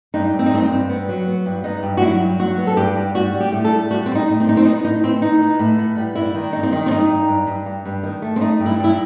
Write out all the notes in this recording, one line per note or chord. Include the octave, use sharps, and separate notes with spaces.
G2 D#4
G2
C4
D#4
G2 C4
C4
G2
B3
F#3
B3
G2
B3 D#4
G2
F#4
F#3 E4
G2
F#3 F#4
B3
A4
G2 G4
G2
G3 F#4
G3
G4
A2
A4
G3
G3 F#4
A2 C4
D#4
A2
C4
A2 D#4
C4
B3 D#4
A2 D#4
A2 C4
B3 D#4
B3
A2
B3
G3
G2 E4
D#3
G2 D#4
C4
D#3 D#4
C4
G2 D#4
G2
G2
G2
G2
G2
D#3
A3
C4
A3 D#4
G2
E4
G2 E4